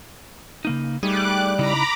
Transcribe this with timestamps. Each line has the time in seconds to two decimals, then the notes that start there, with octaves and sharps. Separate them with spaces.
0.65 C#3 A#3 D#4
1.03 G3 A3 D#4 G#4 D6 F#6
1.59 C#3 D#4 E4 A#5 B5 D6